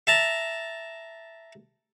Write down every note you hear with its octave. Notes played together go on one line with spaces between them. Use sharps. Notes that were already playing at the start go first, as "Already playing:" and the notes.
E5 A5 A#5